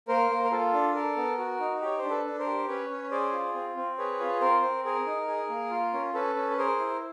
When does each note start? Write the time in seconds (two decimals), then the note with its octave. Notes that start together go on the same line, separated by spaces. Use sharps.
0.08 A#3 A#4 C5
0.30 A#3
0.44 A#4
0.52 F4 A4
0.73 D4
0.95 A4 A#4
1.17 B3
1.38 F#4
1.60 D#4
1.81 G4 C#5
1.98 C5
2.03 D4
2.10 A4 B4
2.25 D4
2.39 A#4 C5
2.46 G4
2.68 C#4 B4 C#5
2.89 C#4
3.11 G#4 C5 D5
3.33 F4
3.54 C4
3.77 C4
3.98 G#4 B4 C#5
4.20 F4
4.41 C4 A#4 C5
4.63 C4
4.85 G#4 A#4
5.06 D#4
5.27 G#4
5.49 A#3
5.71 F4
5.93 C#4
6.14 C#4 A4 B4
6.36 C#4
6.51 B4
6.58 G#4 A#4 C5
6.79 E4